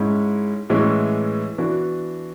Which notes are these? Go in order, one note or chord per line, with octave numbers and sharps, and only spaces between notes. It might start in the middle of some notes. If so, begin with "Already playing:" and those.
Already playing: G#2 G#3 C#4 E4
A2 E3 G#3 C#4
E3 B3 D4 F#4